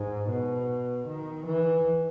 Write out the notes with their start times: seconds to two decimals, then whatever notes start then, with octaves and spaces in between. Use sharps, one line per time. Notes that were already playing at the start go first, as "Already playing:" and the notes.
Already playing: G#2
0.29 B2
1.07 D#3
1.46 E3